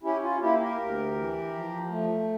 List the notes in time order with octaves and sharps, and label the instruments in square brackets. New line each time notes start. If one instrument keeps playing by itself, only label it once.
[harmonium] C#4 E4 G4
F4
A#3 E4 G4
G4 A#4
D2
E3
F3
A3